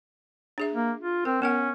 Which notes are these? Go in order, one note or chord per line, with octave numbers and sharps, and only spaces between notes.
D4 G#4 E5
A#3
F4
C4 A#4
B3 C#4 A#4 F#5